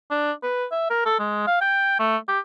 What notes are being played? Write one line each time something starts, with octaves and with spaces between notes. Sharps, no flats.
D4
B4
E5
A#4
A4
G#3
F5
G5
A3
G4